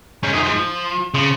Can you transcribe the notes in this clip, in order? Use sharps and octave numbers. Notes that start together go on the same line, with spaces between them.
G#2 C#4
F#2 D#4
G#2 F3
F3
C#3 F3